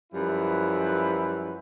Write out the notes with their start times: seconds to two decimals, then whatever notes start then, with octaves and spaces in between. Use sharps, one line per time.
0.13 F#2 F3 G3 E4 B4